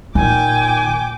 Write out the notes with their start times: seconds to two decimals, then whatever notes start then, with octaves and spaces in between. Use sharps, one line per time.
0.15 A#2 D#3 G5 G#5 D6